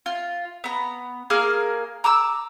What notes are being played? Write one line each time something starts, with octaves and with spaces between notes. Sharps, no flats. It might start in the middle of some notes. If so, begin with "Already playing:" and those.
F4
B3 A#5
A#3 G#4 A#4 F6
A#5 D6 E6